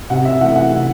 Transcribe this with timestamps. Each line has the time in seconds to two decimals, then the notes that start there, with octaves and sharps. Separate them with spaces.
0.10 C3 F#5
0.25 E5
0.40 E3 A3 F#5
0.56 F#5
0.71 C3